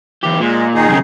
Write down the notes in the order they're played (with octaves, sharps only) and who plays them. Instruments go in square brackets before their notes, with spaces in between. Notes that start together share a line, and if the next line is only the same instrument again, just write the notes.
[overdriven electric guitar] E2 G4
[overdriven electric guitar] A#2 [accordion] G#3
[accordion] D#3 D#4 G#4
[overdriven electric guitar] B1 C#3